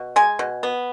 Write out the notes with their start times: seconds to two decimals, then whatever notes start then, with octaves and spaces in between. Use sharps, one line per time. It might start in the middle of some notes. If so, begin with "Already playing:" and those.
Already playing: B2
0.16 G#3 G#5
0.39 B2
0.63 B3